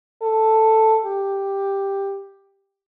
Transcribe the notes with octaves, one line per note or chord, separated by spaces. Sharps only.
A4
G4